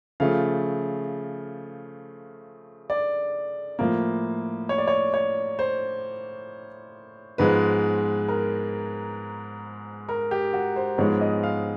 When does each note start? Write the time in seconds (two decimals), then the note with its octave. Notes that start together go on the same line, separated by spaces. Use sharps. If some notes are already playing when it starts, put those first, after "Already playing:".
0.20 C#3 F3 A3 F5
2.90 D5
3.79 A2 F3 A#3
4.69 C#5
4.78 D5
4.88 C#5
5.14 C#5
5.59 C5
7.38 G#2 F3 G#3 B3 B4
8.28 A#4
10.09 A#4
10.31 G4
10.53 F#4
10.76 C5
10.98 G#2 F3 G#3 B3 C#5
11.21 D#5
11.43 F5